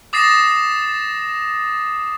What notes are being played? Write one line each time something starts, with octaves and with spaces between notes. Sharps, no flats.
D6 D#6 A6 A#6 C7 E7